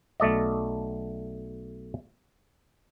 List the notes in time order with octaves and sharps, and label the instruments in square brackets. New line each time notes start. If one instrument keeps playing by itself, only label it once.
[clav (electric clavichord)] B1 A3 D5 D#5